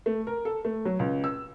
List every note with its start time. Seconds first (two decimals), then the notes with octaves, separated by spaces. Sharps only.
0.06 A3
0.27 A#4
0.45 A4
0.65 A3
0.85 F#3
0.99 C#2
1.24 E6